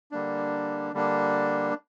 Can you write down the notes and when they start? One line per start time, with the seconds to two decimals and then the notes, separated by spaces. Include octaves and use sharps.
0.11 D3 G3 A#3 D4
0.94 D3 G3 A#3 D4